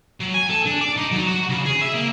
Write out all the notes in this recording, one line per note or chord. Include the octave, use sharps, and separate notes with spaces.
F#3
G#5
A4
D4
D5
D#4
F#3
F#4
C#3
G#4
E5
A#3